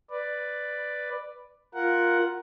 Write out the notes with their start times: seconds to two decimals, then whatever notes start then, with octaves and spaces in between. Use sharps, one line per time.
0.10 B4 D5
1.74 F4 A#4 F#5